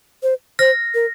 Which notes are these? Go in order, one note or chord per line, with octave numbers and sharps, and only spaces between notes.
C5
C5 F6 A#6
A#4